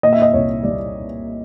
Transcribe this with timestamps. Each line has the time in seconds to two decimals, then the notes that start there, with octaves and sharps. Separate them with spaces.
0.03 A#2 D#5
0.13 E5
0.22 D#5
0.33 C2 C#5
0.63 G3 D5